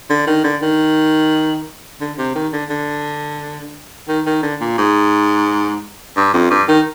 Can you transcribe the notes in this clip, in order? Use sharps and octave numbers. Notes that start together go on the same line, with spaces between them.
D3
D#3
D3
D#3
D3
C3
D#3
D3
D3
D#3
D#3
D3
A#2
G#2
G2
F2
G2
D#3